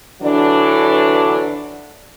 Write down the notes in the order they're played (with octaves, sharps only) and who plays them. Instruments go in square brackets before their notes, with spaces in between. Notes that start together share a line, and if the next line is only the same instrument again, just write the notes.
[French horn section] D3 E3 F#3 D4